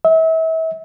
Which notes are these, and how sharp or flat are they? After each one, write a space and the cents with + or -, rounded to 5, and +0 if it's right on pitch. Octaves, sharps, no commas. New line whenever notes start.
E5 -35